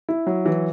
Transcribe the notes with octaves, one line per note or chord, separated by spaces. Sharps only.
E4
F#3
E3